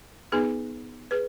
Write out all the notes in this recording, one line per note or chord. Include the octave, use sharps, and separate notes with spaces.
B3 D#4 G#4 B4
G#4 B4